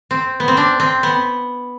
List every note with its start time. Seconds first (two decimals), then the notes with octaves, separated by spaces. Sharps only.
0.11 C4
0.40 B3
0.48 C4
0.57 D4
0.80 C4
1.03 B3